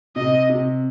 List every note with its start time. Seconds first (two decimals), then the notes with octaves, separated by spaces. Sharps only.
0.16 C3 D#5
0.50 C3